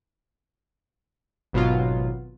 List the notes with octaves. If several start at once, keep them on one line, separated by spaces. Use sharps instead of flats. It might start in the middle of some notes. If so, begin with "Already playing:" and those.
G#1 B2 F#3 F4